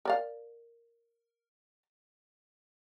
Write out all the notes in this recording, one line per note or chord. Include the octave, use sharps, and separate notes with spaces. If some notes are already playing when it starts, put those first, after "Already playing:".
A#4 D5 F5